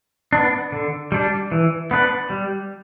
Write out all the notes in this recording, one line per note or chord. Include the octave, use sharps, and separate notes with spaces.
B3 D4
D3
G3 D4
E3
B3 D4 B4
G3